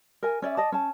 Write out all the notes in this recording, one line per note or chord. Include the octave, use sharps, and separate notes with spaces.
A#4 G#5
C#4 D5 E5
D5 D#5 A5
C#4 A5